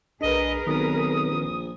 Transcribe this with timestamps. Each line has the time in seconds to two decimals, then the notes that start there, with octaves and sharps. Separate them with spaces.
0.21 B1 D4 G#4 A#4 B4 D#5
0.67 B1 D#3 C4 D#6
1.31 A#1